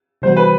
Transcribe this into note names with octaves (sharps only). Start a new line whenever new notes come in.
C3 E3 G3 B3 F#4 C5
B4